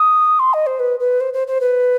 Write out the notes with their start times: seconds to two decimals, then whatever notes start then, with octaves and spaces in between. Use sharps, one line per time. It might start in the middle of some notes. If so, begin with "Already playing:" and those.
Already playing: D#6
0.40 C6
0.54 D#5
0.67 C5
0.80 B4
1.00 B4
1.21 C5
1.34 C5
1.48 C5
1.61 B4